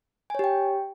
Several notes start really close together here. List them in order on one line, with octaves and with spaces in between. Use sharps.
G#5 C#5 G4 G5